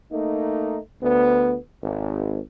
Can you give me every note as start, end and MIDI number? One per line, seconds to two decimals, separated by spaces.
0.12 0.78 57
0.12 0.78 58
0.12 0.78 63
1.01 1.56 38
1.01 1.56 59
1.83 2.39 32